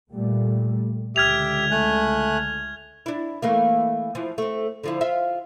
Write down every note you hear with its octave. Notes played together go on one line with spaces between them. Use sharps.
A#2 G3 A3
C#2 D3 G4 E5 F6 G#6 F7
A3 G#5 F#6
D4 E4
E3 A3 A#3
E3 F3
A3 C4
D3 F3 E4
F4 E5